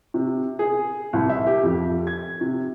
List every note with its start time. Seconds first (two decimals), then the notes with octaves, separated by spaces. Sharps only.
0.14 C3
0.59 G#4
1.13 C2
1.29 E5
1.47 G4
1.63 F2
2.07 G#6
2.41 C3